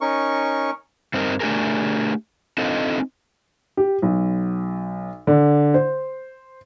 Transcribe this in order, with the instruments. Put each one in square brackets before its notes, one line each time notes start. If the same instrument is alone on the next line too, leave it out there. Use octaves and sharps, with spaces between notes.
[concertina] C#4 D#4 A#4 C#6
[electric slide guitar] G2 C4 D#4 G#4 A#4
A3 D4 G4 G#4 A#4
C4 D4 D#4 F4 A4 D#5
[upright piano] G4
B1
D3
C5